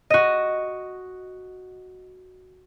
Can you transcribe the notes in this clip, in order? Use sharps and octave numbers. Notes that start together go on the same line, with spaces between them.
F#4 D#5